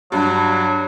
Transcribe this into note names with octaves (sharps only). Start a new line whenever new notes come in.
G2 F#3